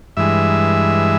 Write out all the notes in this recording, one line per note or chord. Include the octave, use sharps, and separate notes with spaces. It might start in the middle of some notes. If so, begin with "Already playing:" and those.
G2 E3 G#3 E5